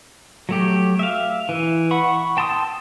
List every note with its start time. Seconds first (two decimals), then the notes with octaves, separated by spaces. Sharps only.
0.49 F#3 A3 G4
0.99 E5 F5
1.49 E3
1.91 F#5 B5 C#6
2.14 C#6
2.37 G5 A5 C6 D#6 E6